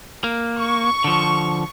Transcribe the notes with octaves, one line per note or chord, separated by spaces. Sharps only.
A#3
C#6
D3 F3